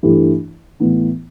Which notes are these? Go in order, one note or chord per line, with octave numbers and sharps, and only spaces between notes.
G2 E3 A3 E4 G4
A2 E3 B3